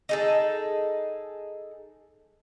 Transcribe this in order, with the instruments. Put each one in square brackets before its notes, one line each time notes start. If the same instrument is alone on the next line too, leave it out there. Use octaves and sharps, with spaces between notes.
[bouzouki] D#4 G#4 A4